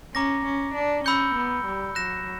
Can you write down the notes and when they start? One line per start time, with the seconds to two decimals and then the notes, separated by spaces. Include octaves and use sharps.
0.14 C#4 A#5 D6 A#6
0.45 C#4
0.74 D4
1.04 C#4 B5 E6 G6 C#7 G7
1.34 B3
1.65 G3
1.95 F#3 F#6 A#6 E7